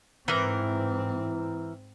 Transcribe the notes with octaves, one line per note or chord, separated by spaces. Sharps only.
G#2 E3 C4 A#4